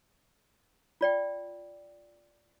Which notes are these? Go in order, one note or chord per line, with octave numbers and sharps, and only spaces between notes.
F4 D5 G5